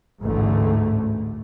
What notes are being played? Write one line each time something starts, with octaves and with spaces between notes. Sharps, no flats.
A1 D2 G#2 D3 A3